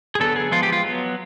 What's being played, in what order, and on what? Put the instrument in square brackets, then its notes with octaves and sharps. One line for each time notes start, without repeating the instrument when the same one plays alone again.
[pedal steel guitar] G#4
D3 F#3 B3 A4
G#4
F3 G#3 B3 F4
G4
F4
F#3 B3